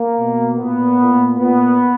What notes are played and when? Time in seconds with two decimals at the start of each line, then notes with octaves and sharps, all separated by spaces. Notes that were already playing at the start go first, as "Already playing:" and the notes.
Already playing: A#3
0.19 B2
0.59 A#2 B3
1.00 A#2
1.40 A#2 B3